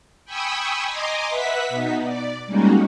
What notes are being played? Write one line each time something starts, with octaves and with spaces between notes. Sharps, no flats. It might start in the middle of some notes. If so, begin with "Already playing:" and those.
G5 G#5 B5 C#6 D#6 E6
D#5 G#5 A#5 C6 D6
B4 E5 F#5 B6
B2 B3 D#4
D5
G3 G#3 A#3 C#4 D#4 F#4